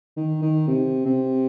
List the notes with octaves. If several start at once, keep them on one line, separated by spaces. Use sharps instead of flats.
D#3
D#3
C3
C3